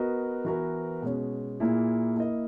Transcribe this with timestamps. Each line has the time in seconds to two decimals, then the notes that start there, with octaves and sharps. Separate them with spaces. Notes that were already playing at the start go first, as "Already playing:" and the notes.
Already playing: B3 F#4 A#4 D#5
0.45 E3 B3 F#4 A#4
1.02 B2 G#3 C#4
1.60 A#2 A#3 E4 G#4
2.17 A#3 E4 A#4 D#5